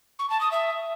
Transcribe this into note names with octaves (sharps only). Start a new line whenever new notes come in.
C#6
A5
D#6
E5